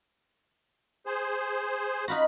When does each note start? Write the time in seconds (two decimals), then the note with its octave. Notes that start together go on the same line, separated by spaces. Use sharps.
1.06 G#4 C5
2.08 D#4 F4 F#4 B5